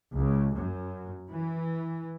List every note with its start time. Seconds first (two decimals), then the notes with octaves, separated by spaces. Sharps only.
0.18 C#2
0.56 F#2
1.29 E3